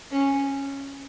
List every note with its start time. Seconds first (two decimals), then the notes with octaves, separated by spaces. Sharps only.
0.11 C#4